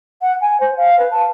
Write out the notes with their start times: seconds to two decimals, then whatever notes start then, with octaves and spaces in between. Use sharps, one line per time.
0.22 F#5
0.41 G#5
0.60 C5
0.77 F5
0.99 B4
1.11 A5